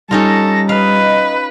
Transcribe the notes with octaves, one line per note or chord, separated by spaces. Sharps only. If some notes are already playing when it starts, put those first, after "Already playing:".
G3 C#4 D#4 F4 A4 A#6
B4 D#5 F5